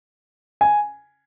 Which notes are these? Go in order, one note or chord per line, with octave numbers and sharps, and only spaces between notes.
G#5